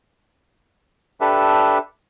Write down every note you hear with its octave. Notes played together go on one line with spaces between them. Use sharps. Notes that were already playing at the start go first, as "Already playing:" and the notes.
D4 G4 A4 B4 E5